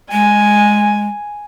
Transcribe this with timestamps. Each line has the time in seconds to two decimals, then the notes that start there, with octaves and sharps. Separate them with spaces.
0.12 G#3 G#5